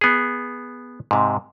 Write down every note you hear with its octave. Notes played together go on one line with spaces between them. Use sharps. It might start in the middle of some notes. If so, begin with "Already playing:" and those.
B3 G#4
G#2 C3